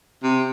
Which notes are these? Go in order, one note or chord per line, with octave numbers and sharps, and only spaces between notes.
C3